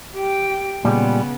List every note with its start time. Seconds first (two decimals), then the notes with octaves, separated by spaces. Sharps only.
0.15 G4 G5
0.85 A#2 C#3 G3 G#3 B3